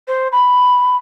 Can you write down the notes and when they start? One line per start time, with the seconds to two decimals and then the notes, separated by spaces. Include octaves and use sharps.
0.08 C5
0.32 B5